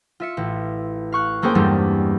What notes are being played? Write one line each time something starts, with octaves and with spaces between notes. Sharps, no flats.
F4 E5 C#7
A1
F5 C#6 F#6
A3 A#3 C#4 G#4 C5 G5
E2 G2 G3 G#3 C#4 D4